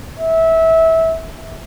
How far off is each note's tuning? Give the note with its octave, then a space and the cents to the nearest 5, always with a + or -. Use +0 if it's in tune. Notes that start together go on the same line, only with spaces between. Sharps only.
E5 -20